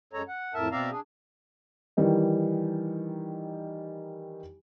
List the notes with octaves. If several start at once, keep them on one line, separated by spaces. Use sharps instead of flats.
F#2 G#3 A4 C#5 A#5
F#5
F2 A2 A#4 E5 A5
B2 C4 D5 E5 F5 A#5
D4 G#4
D#3 E3 G3 D#4